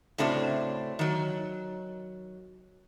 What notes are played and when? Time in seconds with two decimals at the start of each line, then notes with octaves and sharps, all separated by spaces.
0.18 A2 C#3 A3 C4 D4 F#4
0.99 D#3 F#3